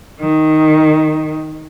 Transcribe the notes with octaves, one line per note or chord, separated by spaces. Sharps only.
D#3